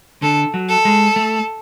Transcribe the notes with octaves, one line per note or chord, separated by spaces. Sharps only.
D3 A4
F#3
A4
G#3
A3